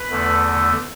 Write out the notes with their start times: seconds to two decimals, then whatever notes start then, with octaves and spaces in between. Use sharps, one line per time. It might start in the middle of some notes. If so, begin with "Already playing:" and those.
Already playing: B4
0.10 E2 D3 A3